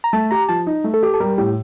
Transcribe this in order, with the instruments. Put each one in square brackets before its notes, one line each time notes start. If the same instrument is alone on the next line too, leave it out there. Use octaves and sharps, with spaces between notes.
[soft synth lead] A#5
[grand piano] A3 [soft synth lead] A5
[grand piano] G4 [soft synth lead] A#5
[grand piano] F3 [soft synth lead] A5
[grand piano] D#4
A3
[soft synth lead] A4
[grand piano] G4
[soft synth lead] A4
[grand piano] G3 [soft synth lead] A#4
[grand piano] A2 [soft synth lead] G4